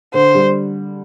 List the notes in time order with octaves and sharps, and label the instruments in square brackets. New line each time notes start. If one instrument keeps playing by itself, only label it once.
[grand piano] D3 [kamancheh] C5
[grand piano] G3